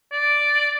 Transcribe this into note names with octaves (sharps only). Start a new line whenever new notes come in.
D5